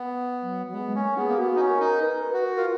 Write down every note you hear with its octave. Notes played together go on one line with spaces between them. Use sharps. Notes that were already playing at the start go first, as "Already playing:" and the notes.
Already playing: B3
F#3
F#3
G#3 B3
A#3 C#4
B3 G#4
A#3
B3 F#4
D#4
C#4
A#4
D#4
B4
A#4
B4
F#4
A#4
F4 A#4